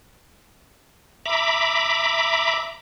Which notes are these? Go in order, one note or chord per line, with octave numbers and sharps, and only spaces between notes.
E5 A#5 B5 D6